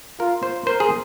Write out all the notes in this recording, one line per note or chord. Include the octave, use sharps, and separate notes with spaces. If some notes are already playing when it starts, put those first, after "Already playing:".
F4 A#4
C5
A#4 C5
G#4